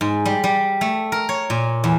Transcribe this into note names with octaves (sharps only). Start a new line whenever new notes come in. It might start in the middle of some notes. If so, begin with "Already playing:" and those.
G#2
G3
G3
A3
A#4
C#5
A#2
E2